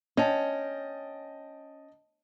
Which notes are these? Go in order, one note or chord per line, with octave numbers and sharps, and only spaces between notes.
C#4 D#5 G5 A5